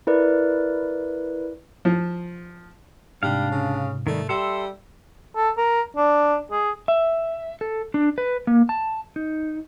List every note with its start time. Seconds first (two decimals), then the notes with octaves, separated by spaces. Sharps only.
0.07 E4 A#4 B4 D5
1.85 F3
3.23 G#2 C3 G3 D4 F5
3.51 C#3
4.07 D#3 G3 A3
4.29 G3 A4 E5 C6
5.36 A4
5.58 A#4
5.97 D4
6.52 G#4
6.88 E5
7.61 A4
7.94 D4
8.18 B4
8.47 A#3
8.69 A5
9.16 D#4